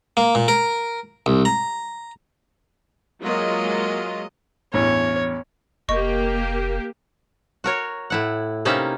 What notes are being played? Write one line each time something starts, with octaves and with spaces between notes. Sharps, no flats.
A#3
A#2
A#4
C2
A#5
F#3 G#3 A#3 F4 D#5
A1 E2 G2 C#5
F1 A#3 G4 D#5 C#6
F#4 A#4 C#5
A2 E4 F#5
C3 A#3 C#4 D#4 E4 E5